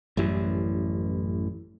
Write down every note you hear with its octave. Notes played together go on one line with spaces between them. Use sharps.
A1 F#2 E3 G3